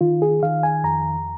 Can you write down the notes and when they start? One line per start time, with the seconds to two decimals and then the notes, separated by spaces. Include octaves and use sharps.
0.01 D#3 F4
0.22 G#4
0.43 D#3 F5
0.63 G#5
0.84 F2 A#5